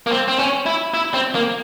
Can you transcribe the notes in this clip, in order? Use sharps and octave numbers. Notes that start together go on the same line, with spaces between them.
A#3
C4
C4
C#4
E4
E4
C4
A#3